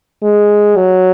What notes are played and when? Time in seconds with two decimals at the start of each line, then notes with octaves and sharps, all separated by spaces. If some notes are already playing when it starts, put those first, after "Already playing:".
0.23 G#3
0.76 F#3